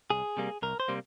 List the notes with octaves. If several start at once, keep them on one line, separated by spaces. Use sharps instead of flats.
C2 G#4
C3 G3 A#3
C2 A#4
C5
C3 G3 A#3